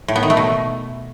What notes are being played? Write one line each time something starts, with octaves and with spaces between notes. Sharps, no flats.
A2
B3
D#3
A3
B2